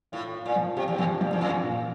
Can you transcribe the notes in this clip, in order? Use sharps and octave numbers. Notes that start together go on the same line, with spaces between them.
A2 F4
F4
A#2
F3
C3 G4
E2
F2 F3
G2 F3
E2
F2 F4
A#2